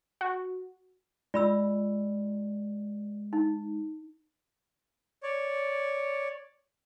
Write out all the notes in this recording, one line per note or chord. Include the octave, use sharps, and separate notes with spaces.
F#4
G#3 F4 D5 B5 E6
D#4
C#5 D5